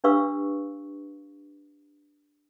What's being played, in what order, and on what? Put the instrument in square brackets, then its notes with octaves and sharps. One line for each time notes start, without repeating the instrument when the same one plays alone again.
[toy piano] D4 G4 B4 F5 C#6 E6